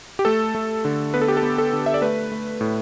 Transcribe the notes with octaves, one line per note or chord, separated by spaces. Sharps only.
G4
A3 A4
A3
D3
B3 B4
A4
G4
A4
B3
A4
D3
E5
D5
A3 B4
A3
A2